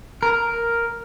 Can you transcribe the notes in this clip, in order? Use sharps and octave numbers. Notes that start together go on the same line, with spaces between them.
A#4